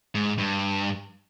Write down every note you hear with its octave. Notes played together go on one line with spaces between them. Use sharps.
G#2
G2